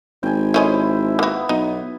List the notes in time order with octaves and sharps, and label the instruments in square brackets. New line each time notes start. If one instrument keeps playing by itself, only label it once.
[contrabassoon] G#1 [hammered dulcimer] G5 G#5
[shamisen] A3 C#4 D#5 [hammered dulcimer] E4 C5
[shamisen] A#3 F#4 [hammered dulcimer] B3
[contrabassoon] B1 [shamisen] D#4